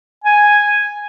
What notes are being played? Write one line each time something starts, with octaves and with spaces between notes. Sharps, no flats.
G#5